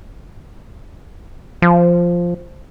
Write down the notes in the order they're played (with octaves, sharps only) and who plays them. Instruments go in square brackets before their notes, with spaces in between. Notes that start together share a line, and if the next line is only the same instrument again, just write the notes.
[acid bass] F3